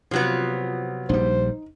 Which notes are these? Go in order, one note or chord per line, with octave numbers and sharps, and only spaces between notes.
C3 F3 F#3 B3 F4
A#1 G3 D#4 C5